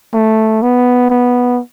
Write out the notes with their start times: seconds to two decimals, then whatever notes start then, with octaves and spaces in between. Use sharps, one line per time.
0.14 A3
0.62 B3
1.10 B3